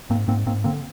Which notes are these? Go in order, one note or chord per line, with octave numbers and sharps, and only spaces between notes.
G#2 A#3 C4
G#2 A#3 C4
G#2 A#3 C4
D3 A#3 C4